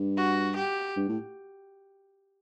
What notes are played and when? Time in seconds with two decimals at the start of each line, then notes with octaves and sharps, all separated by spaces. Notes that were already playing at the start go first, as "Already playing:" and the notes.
Already playing: G2
0.17 F#4
0.56 G4
0.97 G2
1.09 A2